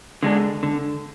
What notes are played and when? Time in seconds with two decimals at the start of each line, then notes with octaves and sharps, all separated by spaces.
0.23 D3 G#3 D4
0.63 D3